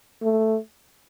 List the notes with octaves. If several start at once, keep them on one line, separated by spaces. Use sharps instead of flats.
A3